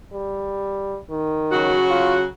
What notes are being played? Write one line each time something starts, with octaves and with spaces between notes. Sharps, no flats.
G3
D#3
C#3 F#3 F#4
F4